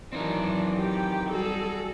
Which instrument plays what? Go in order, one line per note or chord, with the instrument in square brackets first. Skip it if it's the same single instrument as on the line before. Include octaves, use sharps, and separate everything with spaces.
[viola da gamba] E3 F#3 [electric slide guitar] C4 D#4 A#4 [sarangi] D4
[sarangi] G4
[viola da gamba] G3 F#4 G#4 [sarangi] A4